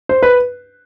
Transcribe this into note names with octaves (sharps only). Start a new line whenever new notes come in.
C5
B4